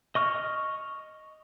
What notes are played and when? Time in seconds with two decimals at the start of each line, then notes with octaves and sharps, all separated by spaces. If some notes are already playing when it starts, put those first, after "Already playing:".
0.15 D#5 C#6 F6